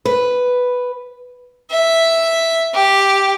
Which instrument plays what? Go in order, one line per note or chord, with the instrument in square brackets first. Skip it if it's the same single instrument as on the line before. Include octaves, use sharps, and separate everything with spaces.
[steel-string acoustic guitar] B4
[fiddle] E5
G4